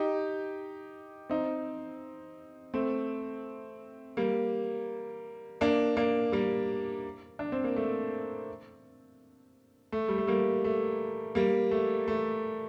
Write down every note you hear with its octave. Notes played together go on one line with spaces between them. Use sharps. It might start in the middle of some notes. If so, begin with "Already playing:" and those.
Already playing: D#4 G4
C4 D#4
A3 C4
G3 A#3
A#3 D4
A#3 D4
G3 A#3
D4
C4
A#3
A3
A3
G3
A3
G3 A#3
A3
G3 A#3
A3
A3